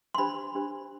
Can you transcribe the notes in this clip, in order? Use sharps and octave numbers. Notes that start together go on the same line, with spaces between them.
C6
D4 G4 C5 B5
D4 G4 C5